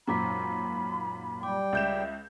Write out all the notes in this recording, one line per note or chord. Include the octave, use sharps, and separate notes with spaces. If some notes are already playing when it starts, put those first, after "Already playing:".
G#1 F#2 A#2 A#5 B5 D6 B6
G3 G5 D6
C#2 E5 G6 E7